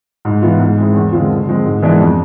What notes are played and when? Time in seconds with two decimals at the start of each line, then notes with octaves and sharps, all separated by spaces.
0.25 G#2
0.42 E3 B3 F4
0.60 G#2
0.77 G#3 C4 E4
0.94 E2
1.12 D3 G#3 C4 F4
1.30 D3
1.47 F3 G#3 C4
1.65 G#2
1.83 E3 G#3 B3 D4
1.99 F2